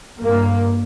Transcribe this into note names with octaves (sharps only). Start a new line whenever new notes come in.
G2 A#3